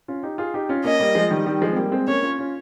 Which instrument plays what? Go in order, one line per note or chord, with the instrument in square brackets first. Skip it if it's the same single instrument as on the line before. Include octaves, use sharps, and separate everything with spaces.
[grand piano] C#4 F4
D#4 G4
F4 G#4
D#4 G4
C#4 F4
[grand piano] A#3 C#4 [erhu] D#5
[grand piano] G3 A#3
F3 G#3
D#3 G3
D#3 G3
F3 G#3
C4
G3 A#3
G#3 C4
[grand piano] A#3 C#4 [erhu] C#5
[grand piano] C#4 F4
C#4 F4